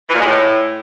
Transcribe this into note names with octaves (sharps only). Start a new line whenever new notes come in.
E3
A#2
G#3
A2